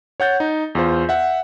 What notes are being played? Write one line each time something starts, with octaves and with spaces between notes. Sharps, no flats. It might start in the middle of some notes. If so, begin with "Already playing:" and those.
C#5 F#5 G6 A6
D#4
E2 F4 C5
E5 F#5